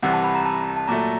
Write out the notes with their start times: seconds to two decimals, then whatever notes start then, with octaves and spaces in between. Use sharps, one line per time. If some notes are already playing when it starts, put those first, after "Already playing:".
0.03 C2 C3 E3 F#5
0.13 A5
0.24 B5
0.35 A#5
0.45 A5
0.77 A5
0.88 A#2 F#3 A3 A#5